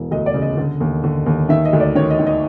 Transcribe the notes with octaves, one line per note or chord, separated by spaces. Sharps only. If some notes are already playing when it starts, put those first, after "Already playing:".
Already playing: E1 E3
D2 D#5
D5
C#3
D#5
D3
D#2
D3
D#2
D#3 E5
D#5
D2
D5
D#3 C#5
D#5
D#3
D#5